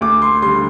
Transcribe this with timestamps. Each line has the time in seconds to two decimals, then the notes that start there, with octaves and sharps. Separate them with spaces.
0.01 D2 D6
0.22 C6
0.42 D3 G3 C6